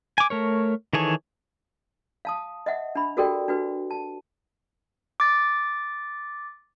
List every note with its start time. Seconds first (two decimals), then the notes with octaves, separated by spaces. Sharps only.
0.18 G#5 D6
0.30 A3 A#4 C#5
0.93 D#3 E3 G#4 A4 C#5
2.25 F5 A5 D#6
2.66 D#5 E5 F#5
2.95 D4 B5
3.17 F#4 G4 A4 A#4 D5 G5
3.48 D4 F#4 B4
3.91 A5
5.20 D6 A6